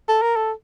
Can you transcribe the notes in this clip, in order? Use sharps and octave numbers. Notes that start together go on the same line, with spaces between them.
A4
A#4
A4